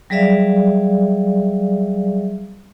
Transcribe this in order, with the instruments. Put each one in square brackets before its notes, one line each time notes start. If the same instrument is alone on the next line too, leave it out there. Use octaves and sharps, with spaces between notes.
[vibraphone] F#3 G3 G#4 D5 E5 F5